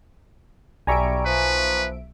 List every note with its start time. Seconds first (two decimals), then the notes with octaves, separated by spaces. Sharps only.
0.87 B1 G3 E5 G#5 A#5 C#6 D7
1.26 F3 B4